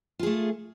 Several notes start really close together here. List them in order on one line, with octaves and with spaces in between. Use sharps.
F4 G#4 A3